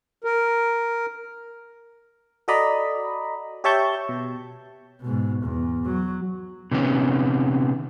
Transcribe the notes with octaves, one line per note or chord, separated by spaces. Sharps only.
A#4
F#4 A4 D5 D#5 A#5 B5
G4 C#5 E5 A5 C#6 G6
B2
G#2 B2
E2
F#3
C3 D#3 B3 C#4